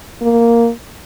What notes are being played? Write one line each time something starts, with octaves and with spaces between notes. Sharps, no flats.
A#3